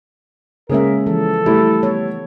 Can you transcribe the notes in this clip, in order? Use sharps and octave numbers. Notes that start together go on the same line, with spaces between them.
C#3 G#3 A#3 C#4 G#4 A#4 E5
E3 F3 A4
G3 A3 E4
B3 C#5